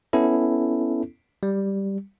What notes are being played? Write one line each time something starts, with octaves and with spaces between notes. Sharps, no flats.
B3 C#4 E4 A4
G3